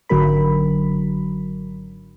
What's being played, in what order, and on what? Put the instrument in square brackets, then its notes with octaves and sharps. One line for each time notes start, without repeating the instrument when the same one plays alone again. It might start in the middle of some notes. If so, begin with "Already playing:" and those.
[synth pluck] G#1 D3 F#3 A#4 B5